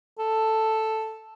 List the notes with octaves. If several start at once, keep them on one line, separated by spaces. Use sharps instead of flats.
A4